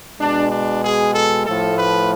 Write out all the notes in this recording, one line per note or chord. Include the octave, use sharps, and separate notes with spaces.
B2 G#3 D4
D4
G#4
A4
A2 F3 A3 A4
B4